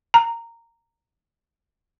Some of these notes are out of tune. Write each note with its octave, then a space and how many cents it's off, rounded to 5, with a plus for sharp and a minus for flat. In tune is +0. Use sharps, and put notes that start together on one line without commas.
A#5 -15